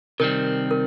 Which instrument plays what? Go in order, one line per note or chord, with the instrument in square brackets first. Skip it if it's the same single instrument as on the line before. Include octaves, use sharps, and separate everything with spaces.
[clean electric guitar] C3 D#3 G3 C4 [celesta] A#4
[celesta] A#4